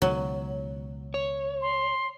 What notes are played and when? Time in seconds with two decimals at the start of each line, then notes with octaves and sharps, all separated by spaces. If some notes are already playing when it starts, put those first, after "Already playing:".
0.02 C#2 B2 D#3 F#3
1.14 C#5
1.61 C6